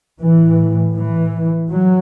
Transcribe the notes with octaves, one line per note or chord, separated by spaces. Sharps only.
A2 E3
E3
F#3